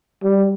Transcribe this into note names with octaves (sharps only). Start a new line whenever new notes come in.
G3